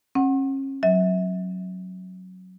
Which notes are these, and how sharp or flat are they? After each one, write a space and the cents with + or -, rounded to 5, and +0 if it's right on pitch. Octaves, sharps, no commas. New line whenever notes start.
C#4 -35 F#5 +0
F#3 +0 E5 -30